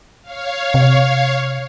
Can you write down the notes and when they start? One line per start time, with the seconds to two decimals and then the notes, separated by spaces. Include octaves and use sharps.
0.22 C#5 F5
0.74 C3